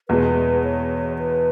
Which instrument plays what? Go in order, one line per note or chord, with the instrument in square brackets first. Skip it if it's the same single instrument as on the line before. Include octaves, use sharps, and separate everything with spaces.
[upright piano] E2 B2 G#3 [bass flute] B4
[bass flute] C#5
B4